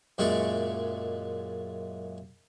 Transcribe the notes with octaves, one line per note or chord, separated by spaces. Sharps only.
F#2 A#2 G#3 A3 D5 C#6